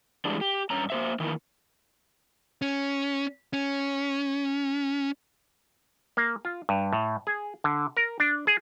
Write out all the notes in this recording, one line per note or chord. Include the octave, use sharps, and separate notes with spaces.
E3 G3 G#3 D4
G4
G2 C#4 A#5
A#3 C5 E5
D#3 E3 A#3 E4
C#4
C#4
A#3
F4
G2
A2
G#4
D3
A#4
D4
G#4